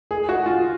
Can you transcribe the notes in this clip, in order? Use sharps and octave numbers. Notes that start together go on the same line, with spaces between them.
G#4
F#4
F4